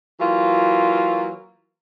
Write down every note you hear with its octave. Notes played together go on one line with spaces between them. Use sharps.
E3 F#3 A#3 F4